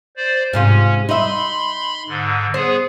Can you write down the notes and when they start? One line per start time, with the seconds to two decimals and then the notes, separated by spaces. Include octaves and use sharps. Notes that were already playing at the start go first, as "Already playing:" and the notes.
0.17 C5 D5
0.53 G#2 C3 C#4 F4
1.09 D#4 E5 B5 C6
2.08 G#2 D3
2.54 B3 G#4 C5